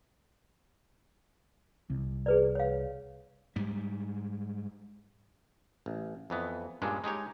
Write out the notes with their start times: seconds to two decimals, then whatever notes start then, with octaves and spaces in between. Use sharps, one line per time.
1.90 C2
2.26 G#4 B4 D5
2.55 C#5 F5
3.56 G#2 G3
5.86 A1
6.30 F2 E3 B3
6.82 G2 A#2 G#3 C#4 D4
7.04 G#3 D#4 G4 C#5